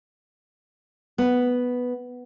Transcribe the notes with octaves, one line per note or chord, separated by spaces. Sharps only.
B3